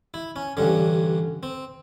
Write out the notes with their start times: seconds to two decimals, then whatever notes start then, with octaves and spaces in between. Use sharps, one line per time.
0.14 E4
0.36 C#4
0.57 A1 G2 D3 C#4
1.43 C4